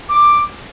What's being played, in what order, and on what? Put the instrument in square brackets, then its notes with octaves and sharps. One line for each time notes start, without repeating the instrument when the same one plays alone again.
[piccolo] D6